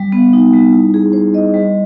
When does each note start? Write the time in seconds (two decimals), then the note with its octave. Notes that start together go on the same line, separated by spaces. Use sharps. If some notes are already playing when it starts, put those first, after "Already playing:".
Already playing: G3
0.12 B3
0.33 D#4
0.53 G3
0.73 E4
0.94 G#4
1.13 C5
1.34 D#5
1.54 G3